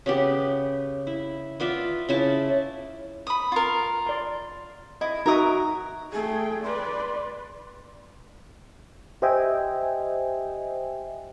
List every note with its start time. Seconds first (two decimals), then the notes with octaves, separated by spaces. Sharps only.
0.06 C#3 B3 G4
1.07 E4
1.60 B3 F4 D5 E5
2.09 C#3 E4 A5
3.27 B5 D#6
3.52 F4 A#4
4.06 D5 C6
5.01 E4 D#5
5.26 D#4 F#4 A#4 E5 A#5 D#6
6.12 A3 G#4 G5
6.63 B4 D5 C6
9.22 G4 C5 D#5 E5 G5 G#5